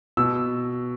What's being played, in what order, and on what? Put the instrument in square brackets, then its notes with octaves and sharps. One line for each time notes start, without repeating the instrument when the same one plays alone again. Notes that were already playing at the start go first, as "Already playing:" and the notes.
[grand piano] B2 E6